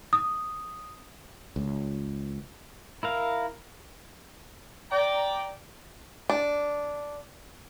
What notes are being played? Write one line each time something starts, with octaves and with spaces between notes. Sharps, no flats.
D#6
C#2
E4 A#4 F5
D5 G5 A#5
D4